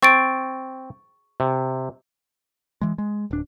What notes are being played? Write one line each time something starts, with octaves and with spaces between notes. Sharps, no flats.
C4 C#6 A6 D7
C3
E3 G#3
G#3
D1 D4